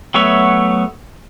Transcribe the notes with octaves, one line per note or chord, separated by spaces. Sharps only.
F#3 A3 B3 C#5 E5